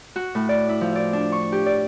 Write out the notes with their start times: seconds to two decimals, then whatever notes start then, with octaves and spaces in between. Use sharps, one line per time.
0.16 F#4
0.35 A2
0.49 D5
0.69 E4
0.81 F3
0.95 D5
1.13 D4
1.32 C#6
1.52 G4
1.66 D5